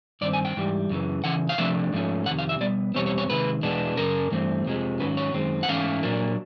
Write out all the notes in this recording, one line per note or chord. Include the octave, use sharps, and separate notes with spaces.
G2 D#3 C4 D5
G#5
G5
G#2 E3 G3
F#2 C#3 E3
C#3 E3 F#5
F5
C3 F3 A3 D4 E5
G#2 F3 A3 C#4
F2 C3 D#3 F#5
F5
E5
B2 G3 B3 D5
E2 B2 G3 C4 C#5
C#5
C#5
C3 D#3 G#3 B4
E2 B2 G#3 B3 D4
F#2 C#3 A#4
G2 E3 A3 C4
F2 C3 F3 G#3
G#2 D#3 F#3 C#4 B4
C#5
F#2 D#3 G#3 C4
F#5
G#2 E3 A3 C#4 F5
A#2 F#3 A#3 D4